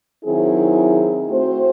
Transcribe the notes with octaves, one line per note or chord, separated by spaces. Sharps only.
D#3 F#3 C4 E4 G#4
A3 C4 F#4 C5